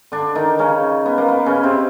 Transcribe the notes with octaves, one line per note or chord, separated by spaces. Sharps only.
D3 D4
D#3 D#4
C#3 C#4
B3
A#3
B3
C#3 C#4
C3 C4